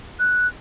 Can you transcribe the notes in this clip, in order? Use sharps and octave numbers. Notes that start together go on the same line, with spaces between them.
F#6